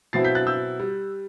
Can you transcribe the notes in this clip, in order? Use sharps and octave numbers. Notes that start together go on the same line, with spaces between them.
B2 F#3 C4 E4 A6 C7
G6 B6
F#6 A6
E6 G6
G3